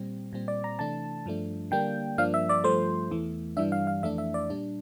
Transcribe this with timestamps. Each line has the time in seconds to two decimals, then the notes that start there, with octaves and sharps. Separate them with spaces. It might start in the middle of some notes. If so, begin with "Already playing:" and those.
Already playing: A#2 G3 C4
0.33 A#2 G3 C4
0.48 D5
0.64 A#5
0.79 C3 E3 A3 D4 A5
1.26 G2 F3 A3 D4
1.71 D3 G3 A#3 D4 G5
2.18 G2 F3 A#3 D4 F5
2.34 E5
2.49 D5
2.64 G2 F3 A3 C5
3.11 E2 E3 A3
3.57 G2 E3 G3 D4 E5
3.72 F5
3.87 F5
4.03 F2 E3 A3 D4 E5
4.18 E5
4.34 D5
4.50 A#2 G3 D4